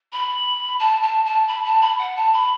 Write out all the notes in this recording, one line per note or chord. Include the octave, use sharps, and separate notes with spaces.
B5
A5
A5
A5
B5
A5
B5
F#5
A5
B5